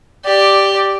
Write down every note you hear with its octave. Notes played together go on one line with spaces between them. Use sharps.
G4 D5